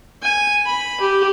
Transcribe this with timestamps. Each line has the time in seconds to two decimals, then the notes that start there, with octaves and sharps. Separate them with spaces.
0.22 G#5
0.66 B5
1.00 G4